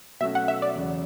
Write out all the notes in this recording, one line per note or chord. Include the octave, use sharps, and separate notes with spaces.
B2 F#3 A3 C#4 F#4 E5
F#5
E5
D5
E2 C#3 F#3